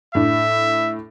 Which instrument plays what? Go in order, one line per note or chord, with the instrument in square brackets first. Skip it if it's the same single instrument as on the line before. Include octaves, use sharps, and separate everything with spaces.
[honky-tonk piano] A2 D4 [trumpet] E5